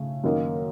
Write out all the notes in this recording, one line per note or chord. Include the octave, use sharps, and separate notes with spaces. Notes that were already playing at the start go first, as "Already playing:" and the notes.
Already playing: C#3 A3
F#2 D#3 A#3 D#4